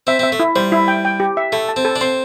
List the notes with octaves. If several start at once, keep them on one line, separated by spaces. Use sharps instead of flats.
C4 E5
C4
E5
A3
E4
G3 C5
E4
G5
G5
G4
E5
A3 A4
A5
C4
A4
D4
C4 C6